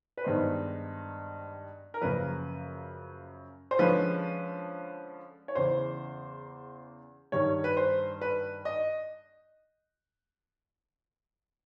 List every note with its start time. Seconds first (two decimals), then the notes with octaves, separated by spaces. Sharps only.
0.17 B4
0.24 G2 D#3 G#3 B3 D#4 C5
1.94 A#4
2.01 F#2 C#3 F3 A#3 B4
3.71 C5
3.79 D3 F3 G#3 C#4 B4
5.48 C#5
5.55 E2 C#3 E3 C5
7.32 G2 D#3 G3 C#5
7.64 B4
7.77 C5
8.21 B4
8.65 D#5